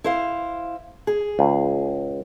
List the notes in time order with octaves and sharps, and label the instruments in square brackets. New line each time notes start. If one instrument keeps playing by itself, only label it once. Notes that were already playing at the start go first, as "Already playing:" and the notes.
[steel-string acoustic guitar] E4 C5 F5
G#4
[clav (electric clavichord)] C#2